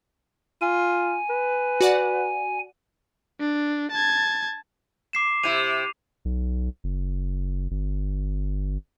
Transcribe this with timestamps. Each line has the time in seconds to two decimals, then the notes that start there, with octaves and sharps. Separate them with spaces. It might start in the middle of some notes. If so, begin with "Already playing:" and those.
0.61 F4 G#5
1.30 B4
1.81 F#4 D5 F#5
3.40 D4
3.91 A5 G#6
5.13 D6 C7 E7
5.43 C3 E4 D#7 F7
6.25 B1
6.84 F#1
7.71 G1